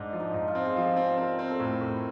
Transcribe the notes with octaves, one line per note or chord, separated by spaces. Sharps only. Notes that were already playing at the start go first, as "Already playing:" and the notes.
Already playing: G#2 D4
F3
D#4
G#2
F4
C4
G#4
F3 G4
C4
C4 A#4
C4
A4
A2 A#4
A2